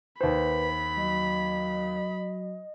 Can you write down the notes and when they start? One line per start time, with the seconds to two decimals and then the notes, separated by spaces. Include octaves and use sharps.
0.21 D#2 B4 C5 B5
0.97 F#3 D#5